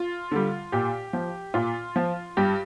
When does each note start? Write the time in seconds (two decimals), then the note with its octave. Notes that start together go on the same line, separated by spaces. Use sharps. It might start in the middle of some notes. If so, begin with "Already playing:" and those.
Already playing: F4
0.31 D3 G3
0.72 A#2 G4
1.13 F3
1.54 A#2 F4
1.96 F3
2.37 G2 G4